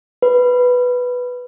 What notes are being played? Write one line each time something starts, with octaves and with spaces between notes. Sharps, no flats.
B4